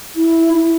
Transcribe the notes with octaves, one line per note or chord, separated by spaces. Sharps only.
E4
E4